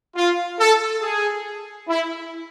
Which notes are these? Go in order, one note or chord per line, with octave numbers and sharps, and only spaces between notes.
F4
A4
G#4
E4